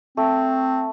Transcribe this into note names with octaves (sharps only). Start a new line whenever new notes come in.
A3 C4